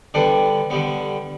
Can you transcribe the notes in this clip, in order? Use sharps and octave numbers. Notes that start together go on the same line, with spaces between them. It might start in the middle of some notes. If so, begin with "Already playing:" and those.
D3 G3 B3 D4
D3 G3 B3